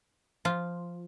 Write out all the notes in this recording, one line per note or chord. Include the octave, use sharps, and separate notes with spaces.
F3 F4